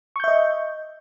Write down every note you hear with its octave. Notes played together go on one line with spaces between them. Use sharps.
D#5 E5 C#6 G6